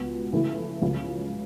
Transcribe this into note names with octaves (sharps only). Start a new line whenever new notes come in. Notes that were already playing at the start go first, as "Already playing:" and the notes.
Already playing: C#2 B2 B3 F#4
C#3 E3 A3 E4
C#2 C#3 F#3